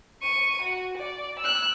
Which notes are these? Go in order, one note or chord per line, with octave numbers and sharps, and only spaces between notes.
C#6 D#7
F#4
D5
E6 F#6